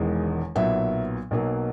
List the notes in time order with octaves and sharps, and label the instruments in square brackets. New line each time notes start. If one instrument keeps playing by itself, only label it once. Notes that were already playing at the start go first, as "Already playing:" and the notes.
Already playing: [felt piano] E1 E2 D#3 G#3
B1 A#2 F#3 B3 E5
B1 B2 F#3 A#3